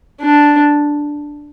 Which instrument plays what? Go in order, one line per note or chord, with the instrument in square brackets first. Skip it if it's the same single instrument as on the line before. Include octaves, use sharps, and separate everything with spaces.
[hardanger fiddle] D4